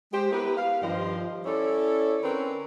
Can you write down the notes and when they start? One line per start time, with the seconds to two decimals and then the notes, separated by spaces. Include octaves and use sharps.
0.12 G#3 G4 C5
0.32 B3 E4 G4 A#4 B4
0.56 F5
0.82 G2 D#3 F3 G4 C5 D#5
1.46 C#4 E4 A4 C#5 D5
2.23 D3 C4 C#4 A#4 B4